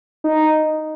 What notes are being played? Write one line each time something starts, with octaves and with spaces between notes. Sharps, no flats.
D#4